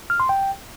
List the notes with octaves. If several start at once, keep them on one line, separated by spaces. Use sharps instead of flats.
F6
C6
G5